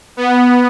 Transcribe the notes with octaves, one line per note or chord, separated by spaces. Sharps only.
B3